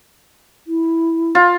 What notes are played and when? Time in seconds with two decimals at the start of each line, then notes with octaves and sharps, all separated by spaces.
0.67 E4
1.35 F4